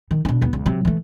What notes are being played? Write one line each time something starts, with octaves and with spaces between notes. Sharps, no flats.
D#3
B2 D4
D#2 B3
C#2
C3 F#3
E3 A3